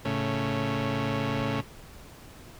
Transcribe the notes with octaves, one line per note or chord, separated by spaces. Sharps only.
A2 C#3